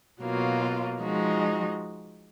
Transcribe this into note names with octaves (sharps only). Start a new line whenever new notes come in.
B2 F#3 A#3 F4
F3 G#3 D#4 F#4